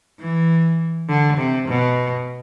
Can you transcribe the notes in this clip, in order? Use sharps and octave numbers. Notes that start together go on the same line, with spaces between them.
E3
D3
C3
B2